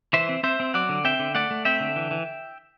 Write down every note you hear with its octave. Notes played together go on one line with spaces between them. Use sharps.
E3 C5 E5
C4
C4 C5 E5
C4
F#3 D5 F#5
D3
C4 E5 G5
D3
A3 D5 F#5
A3
C4 E5 G5
D3
E3
E3